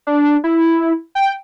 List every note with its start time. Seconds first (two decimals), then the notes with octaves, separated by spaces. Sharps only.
0.07 D4
0.44 E4
1.15 G5